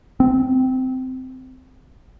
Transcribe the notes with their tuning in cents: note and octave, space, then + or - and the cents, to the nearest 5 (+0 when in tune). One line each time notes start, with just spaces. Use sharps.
C4 -15